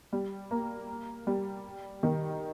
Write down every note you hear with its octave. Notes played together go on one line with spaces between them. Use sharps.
G3
A#3
G3
D#3